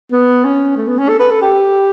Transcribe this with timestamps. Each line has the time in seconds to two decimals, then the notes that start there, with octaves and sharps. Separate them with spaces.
0.12 B3
0.44 C#4
0.77 A3
0.87 B3
0.98 C#4
1.08 A4
1.19 B4
1.30 A4
1.41 G4